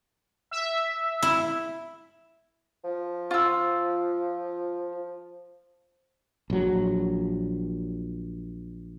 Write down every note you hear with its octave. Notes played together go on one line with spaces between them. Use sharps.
E5
E4
F3
F4 E6
A#1 F#3